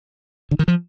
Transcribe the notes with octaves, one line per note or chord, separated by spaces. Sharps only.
D3
D#3
F3